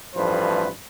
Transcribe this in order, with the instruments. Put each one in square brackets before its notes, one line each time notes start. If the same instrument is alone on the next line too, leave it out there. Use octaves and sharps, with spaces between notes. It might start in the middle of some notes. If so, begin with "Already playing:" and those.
[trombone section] A1 G2 F3 A3 B4 C5